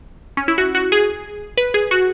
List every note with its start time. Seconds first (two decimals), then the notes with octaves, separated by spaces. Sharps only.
0.37 C#4
0.48 E4
0.58 F#4
0.75 F#4
0.92 G#4
1.57 B4
1.74 G#4
1.91 F#4